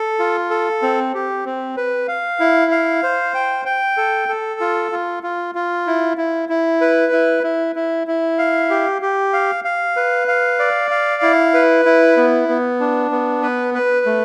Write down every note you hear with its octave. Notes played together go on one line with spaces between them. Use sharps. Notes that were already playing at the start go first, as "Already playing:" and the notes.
Already playing: A4
F4
A4
C4
G4
C4
B4
F5
E4
F5
C5
G5
G5
A4
A4
F4
F4
F4
F4
E4
E4
E4
B4
E4
E4
E4
E4
F5
G4
G4
F5
F5
B4
F5
D5
F5
E4
B4
E4
B3
B3
D4
B3
B4
B4
A3